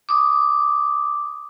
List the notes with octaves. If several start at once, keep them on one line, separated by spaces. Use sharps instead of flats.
D6 D#6